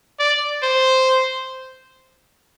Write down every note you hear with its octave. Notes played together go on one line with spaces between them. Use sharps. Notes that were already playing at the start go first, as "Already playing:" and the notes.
D5
C5